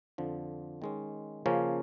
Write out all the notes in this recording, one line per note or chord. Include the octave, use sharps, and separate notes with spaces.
F2 D3 F3
D#3 G#3 C#4
C#3 F3 A#3 C#4